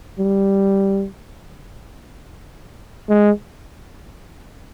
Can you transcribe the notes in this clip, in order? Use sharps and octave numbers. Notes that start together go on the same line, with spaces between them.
G3
G#3